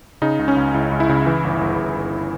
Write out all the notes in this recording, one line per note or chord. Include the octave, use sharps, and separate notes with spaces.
C#3 D#4
C#2
C#4
C#2
C#2 E4
C#2
E4
C#3
E3
G1
G1
G1
G1